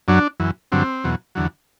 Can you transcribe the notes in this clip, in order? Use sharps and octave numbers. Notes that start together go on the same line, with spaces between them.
F#2 F#3 D4
F#2 E3
G2 D3 F#3 C4
E2 B2 F#3
E2 D3 F#3